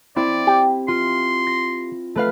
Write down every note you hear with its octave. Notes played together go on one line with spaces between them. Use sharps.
C4 E4 D5
G4
F4 C6
A#6
A3 B4 F5